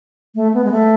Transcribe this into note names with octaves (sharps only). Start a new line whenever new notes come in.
A3
B3
G#3
A3